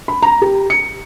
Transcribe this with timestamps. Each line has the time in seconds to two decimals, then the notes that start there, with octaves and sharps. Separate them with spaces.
0.08 B5
0.22 A#5
0.42 G4
0.70 C#7